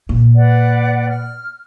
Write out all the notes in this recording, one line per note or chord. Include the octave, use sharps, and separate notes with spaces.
A#2
B4 D5 F#5
F6